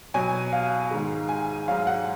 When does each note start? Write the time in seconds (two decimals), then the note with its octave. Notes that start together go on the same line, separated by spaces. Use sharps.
0.14 B2 F#3 G#5
0.53 F5
0.91 G#2 D#3 G#3
1.29 G#5
1.68 G#2 F#3 F5
1.87 F#5